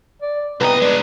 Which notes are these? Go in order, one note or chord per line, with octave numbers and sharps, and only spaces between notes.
D5
C2 B3 C4 D#5 A#5
G#3 D4 D5